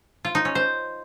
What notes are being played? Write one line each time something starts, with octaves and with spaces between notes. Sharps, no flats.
F4
D#4
C#4
C5